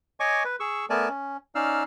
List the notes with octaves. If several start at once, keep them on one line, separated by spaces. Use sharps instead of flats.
C#5 D#5 G#5 C#6 D6
B4
G#4 C#6 E6
A3 B3 A#4 D5 G#5 A5
C#4
C#4 D#4 D5 F5 E6 F6